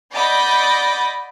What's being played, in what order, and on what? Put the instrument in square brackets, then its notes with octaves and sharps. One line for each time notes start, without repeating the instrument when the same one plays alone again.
[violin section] D5 D#5 F#5 B5 G6 A#6